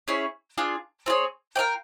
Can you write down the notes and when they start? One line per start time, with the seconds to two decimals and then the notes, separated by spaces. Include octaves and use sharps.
0.08 C#4 E4 G#4 C#5
0.58 D4 F4 G#4
1.06 C4 F4 G#4 C#5
1.56 F4 A#4 D5 G5